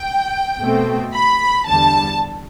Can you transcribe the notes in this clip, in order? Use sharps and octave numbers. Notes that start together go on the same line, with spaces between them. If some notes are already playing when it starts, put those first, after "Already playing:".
Already playing: G5
B2 A3 C4
B5
E2 D3 G3 A5